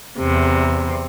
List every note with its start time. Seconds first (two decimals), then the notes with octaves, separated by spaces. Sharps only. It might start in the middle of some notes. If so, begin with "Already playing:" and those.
0.18 E2 C3